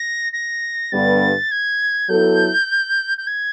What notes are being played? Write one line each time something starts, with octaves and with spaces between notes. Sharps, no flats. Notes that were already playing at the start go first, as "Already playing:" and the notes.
Already playing: A#6
A#6
G2 D3 G3 B3 A6
G#6
F#3 B3 E4 A4 G6
G6
G#6